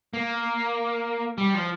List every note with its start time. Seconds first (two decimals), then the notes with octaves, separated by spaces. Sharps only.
0.14 A#3
1.38 G3
1.54 F3